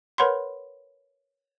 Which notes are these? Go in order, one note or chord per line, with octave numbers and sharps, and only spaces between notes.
A#4 B4 C#5 F#5 B5 C6